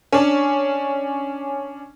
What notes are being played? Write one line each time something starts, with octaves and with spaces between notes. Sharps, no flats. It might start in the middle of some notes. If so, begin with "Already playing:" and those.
C#4 D4